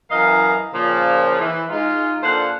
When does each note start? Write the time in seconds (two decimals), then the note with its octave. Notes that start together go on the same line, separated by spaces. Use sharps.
0.10 F#2 E3 A#4 D#5 F5
0.73 A#2 C#3 F3
1.40 E3
1.70 G#3 D#4 F4
2.22 A#2 D4 A4 C5 F5 F#5